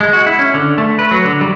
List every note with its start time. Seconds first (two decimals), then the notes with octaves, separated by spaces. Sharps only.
0.01 G#3
0.13 F#4
0.27 E4
0.39 C#4
0.54 D3
0.78 A3
0.99 B4
1.11 F#3
1.25 D3
1.41 G3